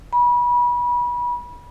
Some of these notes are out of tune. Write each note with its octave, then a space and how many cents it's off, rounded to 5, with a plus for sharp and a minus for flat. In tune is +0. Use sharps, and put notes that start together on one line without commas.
B5 -30